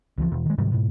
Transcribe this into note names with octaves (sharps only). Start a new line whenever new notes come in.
C#2 E3 F3
E1
D#3 G#3
G#2 C3 D#3 G3
G#2 B2